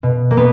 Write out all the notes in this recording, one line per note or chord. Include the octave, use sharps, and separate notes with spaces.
B2
A#3
B3